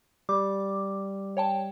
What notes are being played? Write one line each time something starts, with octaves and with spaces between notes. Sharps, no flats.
G3 D6
C#5 G5 A5